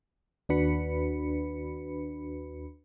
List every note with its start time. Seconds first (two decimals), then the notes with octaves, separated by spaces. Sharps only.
0.49 D#2 D4 F#4 B4 B5 C#7